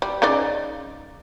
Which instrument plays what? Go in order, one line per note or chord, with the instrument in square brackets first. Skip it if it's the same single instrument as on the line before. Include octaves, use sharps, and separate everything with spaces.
[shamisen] G3
C#3 D#4 D5